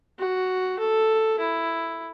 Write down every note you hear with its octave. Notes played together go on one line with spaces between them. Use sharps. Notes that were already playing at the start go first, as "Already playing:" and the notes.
F#4
A4
E4